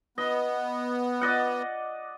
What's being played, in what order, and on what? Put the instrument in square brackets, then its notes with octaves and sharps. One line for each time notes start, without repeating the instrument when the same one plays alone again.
[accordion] B3 [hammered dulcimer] D#5
[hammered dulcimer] D5 D#5 F#5